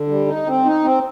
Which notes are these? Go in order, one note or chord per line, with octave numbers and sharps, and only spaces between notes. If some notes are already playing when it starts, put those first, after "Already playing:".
Already playing: D3
G3
D#4
C4
D#4
C4